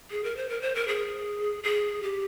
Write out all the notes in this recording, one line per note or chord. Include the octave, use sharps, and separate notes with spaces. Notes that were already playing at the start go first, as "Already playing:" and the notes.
G#4
A#4
C5
A#4
C5
A#4
G#4
G#4
G4